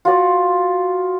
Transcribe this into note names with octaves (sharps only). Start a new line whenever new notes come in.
F4 F#4 D5